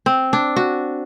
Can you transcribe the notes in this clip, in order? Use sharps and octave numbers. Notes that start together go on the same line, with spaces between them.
C4
D4
F#4